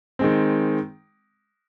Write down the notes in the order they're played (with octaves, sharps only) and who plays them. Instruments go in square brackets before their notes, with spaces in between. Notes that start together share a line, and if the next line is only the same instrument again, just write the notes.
[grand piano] D#3 G#3 C4